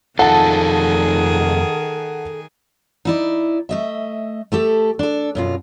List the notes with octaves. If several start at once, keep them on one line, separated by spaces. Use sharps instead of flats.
F2 D#3 D#4 F4 G#4 A4 F#5 A5
D#4 E4 D5
A3 D#5 E5
A3 G4 A4
D4 A4
F#2 B2 F4